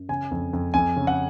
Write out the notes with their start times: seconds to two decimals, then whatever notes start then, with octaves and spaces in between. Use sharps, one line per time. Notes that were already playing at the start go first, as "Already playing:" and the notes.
Already playing: F#2
0.09 C#3 G#5
0.31 F2
0.53 F2
0.74 F2 G#5
0.96 C#3
1.07 F#5